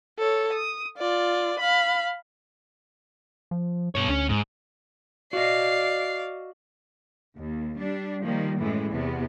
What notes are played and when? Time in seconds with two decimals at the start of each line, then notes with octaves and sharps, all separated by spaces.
0.19 A4 C#5
0.53 D#6
0.98 F4 D5
1.59 F5 B5
3.51 F3
3.95 G2 B2 C#5
4.09 D2 C#4
4.29 G#2
5.33 F#4 D5 D#5 F5 C7
7.37 D#2
7.78 G3 D4
8.25 D#3 F3 G3 A#3
8.60 F#2 A2 E3 G#3
8.93 E2 C3 B3